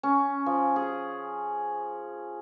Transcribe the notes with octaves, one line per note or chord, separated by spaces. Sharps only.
C#4
F3
G#4